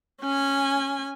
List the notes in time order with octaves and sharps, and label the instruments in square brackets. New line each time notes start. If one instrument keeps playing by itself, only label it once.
[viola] C#4 G#5